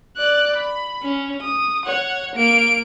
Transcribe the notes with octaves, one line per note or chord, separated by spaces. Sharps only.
D5 F#6
B5
C#4
D#6
C#5 F#5
A#3 D7